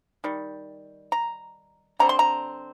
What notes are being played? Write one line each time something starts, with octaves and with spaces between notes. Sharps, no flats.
D#3 G3
A#5
D3 G3 C4 A#5
C6
A#5